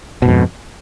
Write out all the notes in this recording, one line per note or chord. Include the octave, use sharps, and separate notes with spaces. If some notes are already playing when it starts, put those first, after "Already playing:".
F2 G#2 B2